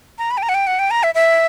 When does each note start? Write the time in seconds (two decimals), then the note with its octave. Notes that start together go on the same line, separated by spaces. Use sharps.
0.18 A#5
0.31 B5
0.38 G5
0.43 A#5
0.49 F#5
0.54 G5
0.67 F#5
0.79 G5
0.91 A#5
1.03 E5
1.15 E5